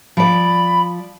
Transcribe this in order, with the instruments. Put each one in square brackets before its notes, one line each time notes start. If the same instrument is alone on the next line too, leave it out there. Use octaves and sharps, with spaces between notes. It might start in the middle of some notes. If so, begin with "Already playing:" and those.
[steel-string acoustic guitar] F3 D5 [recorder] B5